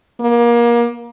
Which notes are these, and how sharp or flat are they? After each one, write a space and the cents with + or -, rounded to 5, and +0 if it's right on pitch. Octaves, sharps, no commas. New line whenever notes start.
A#3 +30